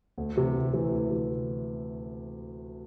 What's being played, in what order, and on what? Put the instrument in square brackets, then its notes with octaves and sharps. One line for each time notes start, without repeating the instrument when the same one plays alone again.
[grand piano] D2
C3 E3
D2
C3 E3
D2
C3 E3